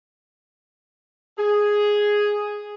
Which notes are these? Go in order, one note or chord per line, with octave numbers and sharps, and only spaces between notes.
G#4